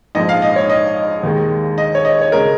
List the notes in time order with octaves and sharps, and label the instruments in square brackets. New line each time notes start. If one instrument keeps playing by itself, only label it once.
[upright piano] A#1 G#2 F3 G#3 D#5
F5
D#5
C#5
D#5
D#2 D#3 G#3
D#5
C#5
D#5
C#5
C#3 G#3 A#4